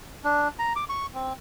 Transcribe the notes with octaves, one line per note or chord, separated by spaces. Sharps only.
D4
A#5
D6
C#6
C4